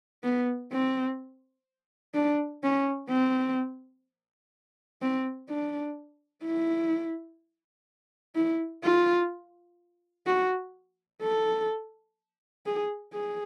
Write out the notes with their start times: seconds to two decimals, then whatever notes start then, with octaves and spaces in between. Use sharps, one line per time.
0.23 B3
0.72 C4
2.14 D4
2.63 C#4
3.10 C4
5.02 C4
5.49 D4
6.44 E4
8.36 E4
8.84 F4
10.27 F#4
11.22 A4
12.66 G#4
13.13 G#4